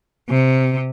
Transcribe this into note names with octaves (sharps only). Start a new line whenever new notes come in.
C3